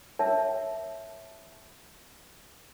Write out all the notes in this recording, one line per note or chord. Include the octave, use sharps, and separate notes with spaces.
A#4 C#5 E5 G5 A5